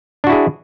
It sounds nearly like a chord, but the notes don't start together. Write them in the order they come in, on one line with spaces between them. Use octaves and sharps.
D4 F#4 E4 G#4